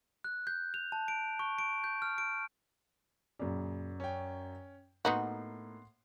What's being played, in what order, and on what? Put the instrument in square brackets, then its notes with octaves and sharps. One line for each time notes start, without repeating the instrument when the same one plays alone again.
[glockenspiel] F#6
G6
F7
A5
D7
C#6
D7
G6
F6
D7
[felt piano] F#2 D5 [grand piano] A#2 C#3
[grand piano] C#4 G5
[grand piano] A2 A#3 [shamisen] B3 D#4 F#4 [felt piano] F#5 C6